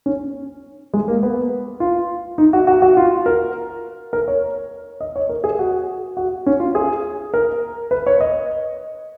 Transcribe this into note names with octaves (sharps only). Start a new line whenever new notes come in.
C#4
G#3
A#3
B3
F4
D#4
F#4
F#4
F#4
F4
A#4
A#4
C#5
D#5
C#5
A#4
G#4
F#4
F#4
C#4
F4
G#4
A#4
B4
C#5
D#5